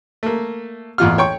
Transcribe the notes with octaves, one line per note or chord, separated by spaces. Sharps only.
A3 A#3
A1 E2 F4 F6
C#5 G5 C#6